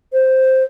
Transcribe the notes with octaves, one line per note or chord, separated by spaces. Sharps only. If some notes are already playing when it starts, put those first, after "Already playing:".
C5